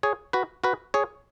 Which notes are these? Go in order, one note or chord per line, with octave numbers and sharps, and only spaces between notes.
G#4 C#5
F#4 B4
F#4 B4
G#4 C#5